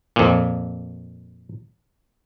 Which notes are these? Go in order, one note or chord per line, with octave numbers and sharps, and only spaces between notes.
F2 A#2